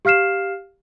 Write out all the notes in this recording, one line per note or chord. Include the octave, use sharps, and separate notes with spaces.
G4 F5 F6 C7 E7